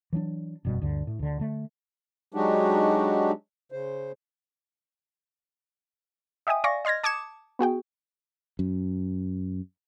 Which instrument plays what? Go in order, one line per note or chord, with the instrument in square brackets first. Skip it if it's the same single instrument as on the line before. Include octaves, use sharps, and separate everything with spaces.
[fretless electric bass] E3 F#3 C#4 D4
F1 F#2 B2 G3
D2 G2 D3
A2
D2 D3
D3 A3
[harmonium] F#3 G#3 D4 D#4 F#4 G4
C#3 C5
[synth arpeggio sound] D#5 E5 G5 G#5 D#6
D5 F5 G#5 C#6 A#6
D#5 C6 F6 G#6 A#6
A5 D6 D#6 G#6 C#7 E7
B3 F#4 G#4 G5
[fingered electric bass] F#2